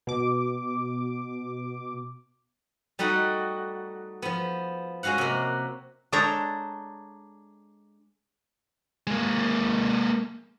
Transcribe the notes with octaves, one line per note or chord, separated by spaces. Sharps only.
B2 D6
G3 A3 D#4 F#4
F3 B3
G#3 C#4 F#4 F5 F#5
C3 A#3
G#3 D4 A4 C#5 G5 A#5
G#3 A#3